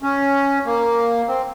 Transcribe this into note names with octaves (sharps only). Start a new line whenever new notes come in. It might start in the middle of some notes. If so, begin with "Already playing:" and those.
C#4
A#3
C4